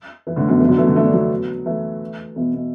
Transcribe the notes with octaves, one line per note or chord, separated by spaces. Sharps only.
E3
A2 D3
F#2 B2
B2 E3
D3 F#3
E3 A3
D3 F#3
E3 A3
D4
F#3 B3
E3 A3
B2 E3
B2